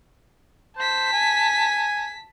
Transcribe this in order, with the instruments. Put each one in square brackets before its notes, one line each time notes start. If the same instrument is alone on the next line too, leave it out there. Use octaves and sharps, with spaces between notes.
[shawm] C5 [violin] A5 B6
[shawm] G#5